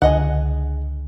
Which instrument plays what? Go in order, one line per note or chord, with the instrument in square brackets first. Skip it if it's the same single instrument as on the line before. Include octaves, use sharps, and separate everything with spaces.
[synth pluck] C#2 D3 [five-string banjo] G#4 D#5 F#5